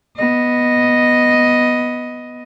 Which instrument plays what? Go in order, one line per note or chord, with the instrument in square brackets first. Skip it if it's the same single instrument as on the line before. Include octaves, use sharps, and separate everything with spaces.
[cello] B3 D#5